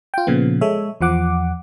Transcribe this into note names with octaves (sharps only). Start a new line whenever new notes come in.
F4 G5
A#2 C#3 F3 B3
G#3 A4 C#5 E5
E2 F3 F#5 D6